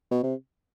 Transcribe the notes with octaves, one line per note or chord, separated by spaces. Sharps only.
B2
C3